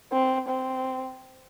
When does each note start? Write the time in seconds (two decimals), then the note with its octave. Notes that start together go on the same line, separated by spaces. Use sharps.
0.12 C4
0.48 C4